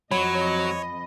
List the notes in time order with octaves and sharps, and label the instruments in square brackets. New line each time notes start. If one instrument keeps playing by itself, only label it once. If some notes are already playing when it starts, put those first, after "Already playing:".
[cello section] F2 D#5 [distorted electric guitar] F#3 [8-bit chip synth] C#5 [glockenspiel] B5